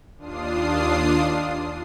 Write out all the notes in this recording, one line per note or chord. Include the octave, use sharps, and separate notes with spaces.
D#2 D4 F4 D#6 C7